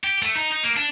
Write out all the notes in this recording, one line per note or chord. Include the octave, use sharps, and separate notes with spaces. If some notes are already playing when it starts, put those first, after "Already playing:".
G4
A3
D#4
D#4
A#3
D4